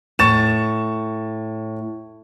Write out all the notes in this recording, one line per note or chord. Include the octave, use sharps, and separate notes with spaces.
A2 C#6 A6 E7